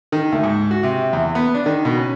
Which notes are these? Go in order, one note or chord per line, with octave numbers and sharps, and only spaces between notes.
D#3
D2
G#2
F#4
C3
E2
B3
D4
D#3
B2
C#4